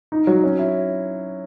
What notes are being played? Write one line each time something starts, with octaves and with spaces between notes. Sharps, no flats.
D#4
F#3
C#4
E4